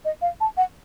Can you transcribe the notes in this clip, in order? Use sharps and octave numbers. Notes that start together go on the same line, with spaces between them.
D#5
F5
A5
F#5